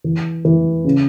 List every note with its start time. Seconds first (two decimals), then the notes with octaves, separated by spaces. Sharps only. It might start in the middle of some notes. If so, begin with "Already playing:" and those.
0.04 E3
0.45 E3
0.85 C#3